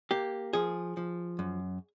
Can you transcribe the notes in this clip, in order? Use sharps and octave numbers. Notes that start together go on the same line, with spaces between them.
A#3 G4
F3 G#4
F3
F#2